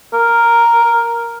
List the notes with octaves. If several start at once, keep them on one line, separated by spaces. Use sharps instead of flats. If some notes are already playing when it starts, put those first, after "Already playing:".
A#4